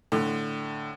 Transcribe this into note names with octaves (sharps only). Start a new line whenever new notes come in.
A2 D3